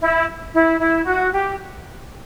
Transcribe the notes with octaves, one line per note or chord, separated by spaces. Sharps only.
E4
E4
E4
F#4
G4